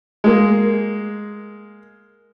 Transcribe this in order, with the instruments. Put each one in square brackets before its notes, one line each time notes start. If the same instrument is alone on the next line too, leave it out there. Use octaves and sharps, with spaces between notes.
[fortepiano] G#3 A#3